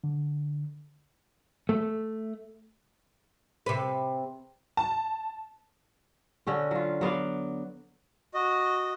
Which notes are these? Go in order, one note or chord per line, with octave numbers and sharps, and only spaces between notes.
D3
A3
C3 B4
A5
D3 C#4 F#4
F#3 F4
F#3 B3 D5 F5
F#4 D#5